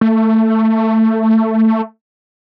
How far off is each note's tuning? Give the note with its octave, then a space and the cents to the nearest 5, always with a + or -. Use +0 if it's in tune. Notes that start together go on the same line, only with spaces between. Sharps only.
A3 +15